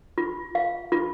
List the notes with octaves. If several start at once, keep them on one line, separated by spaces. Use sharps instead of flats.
F4
F5
F4